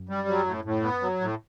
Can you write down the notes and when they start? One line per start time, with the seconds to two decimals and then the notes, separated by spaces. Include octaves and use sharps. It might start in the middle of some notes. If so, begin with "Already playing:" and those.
Already playing: F#2
0.09 G3
0.28 F#3
0.46 A2
0.65 A2
0.83 B3
1.02 F#3
1.21 A2